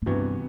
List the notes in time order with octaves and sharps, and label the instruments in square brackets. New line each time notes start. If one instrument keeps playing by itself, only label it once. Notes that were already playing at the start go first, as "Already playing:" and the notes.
[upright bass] A2
[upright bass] G2 [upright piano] C3 E3 B3 F#4